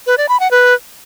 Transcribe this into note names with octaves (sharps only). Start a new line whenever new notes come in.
B4
D5
B5
F#5
B4